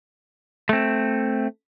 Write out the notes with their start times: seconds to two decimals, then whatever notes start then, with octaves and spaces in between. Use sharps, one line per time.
0.69 A3 C4